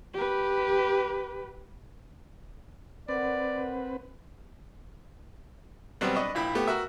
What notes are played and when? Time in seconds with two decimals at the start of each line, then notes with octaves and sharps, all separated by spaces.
0.13 G4 B4
3.08 C4 A#4 B4 D5 F#5
6.01 B2 F#3 G3 B3 C4
6.16 D4 B4 D#5 C#6
6.35 A#1 E4 G5 B5
6.55 A3 B3 G4
6.68 F#4 A#4 E5